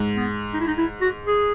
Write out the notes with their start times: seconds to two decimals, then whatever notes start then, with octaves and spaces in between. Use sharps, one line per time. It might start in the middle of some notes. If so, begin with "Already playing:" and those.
Already playing: G#2
0.16 B3
0.54 D#4
0.60 E4
0.67 D#4
0.78 E4
1.01 F#4
1.26 G#4